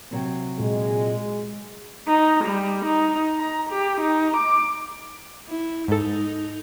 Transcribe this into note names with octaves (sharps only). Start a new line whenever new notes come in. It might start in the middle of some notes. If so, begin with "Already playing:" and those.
C3 F#3 C4
A#2 G#3
D#4
G3
D#4
A#5
G4
D#4
D6
E4
G#2 D#4 A4